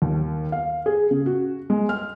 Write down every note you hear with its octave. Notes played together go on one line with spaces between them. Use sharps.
D#2
F5
G#4
C#3
F#4
G#3
F6